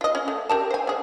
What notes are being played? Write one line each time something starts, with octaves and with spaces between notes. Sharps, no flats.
F4 D#5
C#4
A3
G4 A#4 A5
C5 G#5
C#3 G#4